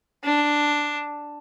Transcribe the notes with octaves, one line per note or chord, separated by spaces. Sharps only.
D4